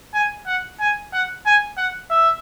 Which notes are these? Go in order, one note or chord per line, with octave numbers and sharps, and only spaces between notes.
G#5
F#5
G#5
F#5
G#5
F#5
E5